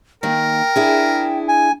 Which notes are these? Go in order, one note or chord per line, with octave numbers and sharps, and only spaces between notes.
D#3 A#3 A#4 G5
D4 E4 G#4
G#5